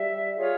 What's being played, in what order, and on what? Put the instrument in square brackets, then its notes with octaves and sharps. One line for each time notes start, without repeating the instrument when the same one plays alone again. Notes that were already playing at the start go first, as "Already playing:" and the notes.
Already playing: [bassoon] G3 [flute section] E5
[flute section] F4 G#4 C#5 F5